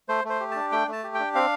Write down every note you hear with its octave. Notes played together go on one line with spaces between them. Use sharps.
A3 C5
A3 C5
G4
D4 A5
A3 G5
A3 A5
G4
G5
D4
C4 F5